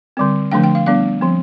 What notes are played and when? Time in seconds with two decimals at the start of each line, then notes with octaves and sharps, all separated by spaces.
0.17 D3 G3 C4
0.52 D3 F3 A3 D4 G5
0.64 G5
0.75 F5
0.86 G3 B3 D4 F5
1.21 F3 C4